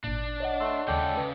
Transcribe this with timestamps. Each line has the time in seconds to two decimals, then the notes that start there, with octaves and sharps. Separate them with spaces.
0.04 G#1 A#2 D4
0.40 C#5 D#5 F#5
0.60 A3 C6 E6
0.88 D#2 C#3 G#3 A4 D5 G5 G6
1.17 C#3 B4